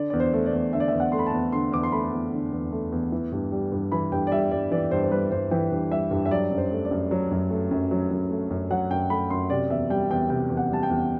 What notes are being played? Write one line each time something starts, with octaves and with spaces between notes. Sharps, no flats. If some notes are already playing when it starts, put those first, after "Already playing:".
Already playing: D3 D5
E2 D5
C5
A3
D5
E2
D3 E5
D5
E5
E2
F#5
A3 C6
B5
A5
E2
D3 C6
E2 D6
C6
A3 B5
E2
D3
E2
A3
E2
E3
G2
G3
G2
E3 B5
G2 G5
D5
G3 E5
G2 D5
E3 D5
G2 C5
C5
G3 B4
G2 C5
E3 G5
G2
G3 E5
G2
E5
F#3 D5
F#2
C5
A3
D5
F#2
F#3
F#2
A3
F#2
F#3
F#2
A3
F#2
F#3 F#5
F#2 G5
A3 B5
F#2 C6
C3 D5
E2 E5
G3 G5
E2 G5
C3 G5
E2
F#5
G3 A5
G5
E2